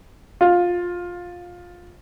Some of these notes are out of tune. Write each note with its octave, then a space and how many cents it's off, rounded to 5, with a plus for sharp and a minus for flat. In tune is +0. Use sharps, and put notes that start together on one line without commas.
F4 +15